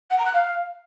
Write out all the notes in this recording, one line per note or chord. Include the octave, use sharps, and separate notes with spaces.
F#5
A#5
F#6
F5